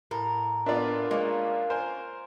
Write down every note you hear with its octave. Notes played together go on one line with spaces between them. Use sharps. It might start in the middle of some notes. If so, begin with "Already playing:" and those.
A2 A#4
A#2 B3 D4 F4 D5 E5
G#3 A#3 C#4
A#4 C5 G#5